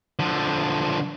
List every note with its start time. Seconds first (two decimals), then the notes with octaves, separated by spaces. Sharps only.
0.19 D3 F3